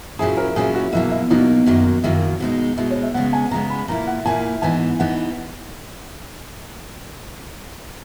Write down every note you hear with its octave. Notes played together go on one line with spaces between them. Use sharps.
A#2 F#3 C#4 E4 G#4
A#4
A#2 F#3 C#4 E4 G#4
F#4
B2 F#3 A#3 E4
E4
B2 F#3 A#3 D#4
F#2 D#3 F#3 A#3
F#2 D#3 F#3 A#3 E4
B2 G#3 D#4
B2 G#3 D#4 E4
C#5
E5
C#3 G#3 B3 F#5
G#5
C#3 G#3 B3 A#5
B5
A#2 A#3 E4 A#5
F#5
A#2 A#3 E4 G#5
G#2 E3 B3 D#4 G#5
E3 B3 D#4 F#5